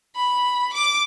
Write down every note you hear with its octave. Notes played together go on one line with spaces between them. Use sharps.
B5
D6